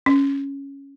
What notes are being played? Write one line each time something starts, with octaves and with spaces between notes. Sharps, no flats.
C#4